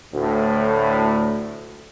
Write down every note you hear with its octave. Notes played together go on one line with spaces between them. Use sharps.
D2 A2